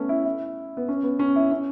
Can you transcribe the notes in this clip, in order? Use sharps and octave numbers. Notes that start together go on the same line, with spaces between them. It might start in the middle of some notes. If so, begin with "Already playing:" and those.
Already playing: A3 B3 C#4
E4
E4
B3
C#4
B3
C#4
E4
C#4